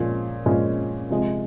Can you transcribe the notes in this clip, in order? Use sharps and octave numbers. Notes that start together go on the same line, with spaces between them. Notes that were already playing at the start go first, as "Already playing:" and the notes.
Already playing: A#2 F3 G#3 C#4
A#2 F3 G#3 C#4
C3 F3 G#3